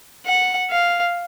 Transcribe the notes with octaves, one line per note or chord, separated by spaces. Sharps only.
F#5
F5